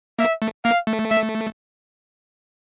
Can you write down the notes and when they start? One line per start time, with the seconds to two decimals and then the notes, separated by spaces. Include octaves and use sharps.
0.19 A#3 E5
0.42 A3
0.64 A#3 F5
0.87 A3
1.10 E5